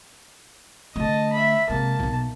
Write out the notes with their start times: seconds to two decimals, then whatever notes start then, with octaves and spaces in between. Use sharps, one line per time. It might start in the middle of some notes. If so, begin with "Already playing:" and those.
0.96 D3 A3 D#5 A5
1.32 E5 B5
1.70 C3 G#3 A#3 A5
2.00 B1 B2